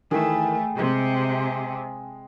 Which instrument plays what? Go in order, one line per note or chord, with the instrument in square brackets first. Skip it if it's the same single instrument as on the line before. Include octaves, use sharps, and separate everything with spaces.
[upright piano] D#3 E3 [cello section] A3 [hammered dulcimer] G#4 G5 B5
[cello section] C3 [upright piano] G#3